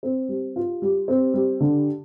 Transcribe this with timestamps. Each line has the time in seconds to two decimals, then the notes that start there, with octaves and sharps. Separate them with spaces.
0.03 C4
0.29 G3
0.56 F4
0.82 G3
1.08 C4
1.34 G3
1.60 D3